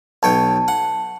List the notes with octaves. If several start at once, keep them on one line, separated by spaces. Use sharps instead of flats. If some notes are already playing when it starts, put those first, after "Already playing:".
B1 C#5 G5 A5
F#5